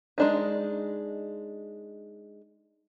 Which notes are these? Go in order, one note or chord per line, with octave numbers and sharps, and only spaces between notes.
G#3 D4 D#4